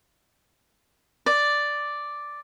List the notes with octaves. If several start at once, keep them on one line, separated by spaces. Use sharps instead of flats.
D5